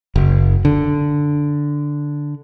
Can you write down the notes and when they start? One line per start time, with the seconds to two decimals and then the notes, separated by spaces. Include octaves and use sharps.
0.16 F#1
0.65 D3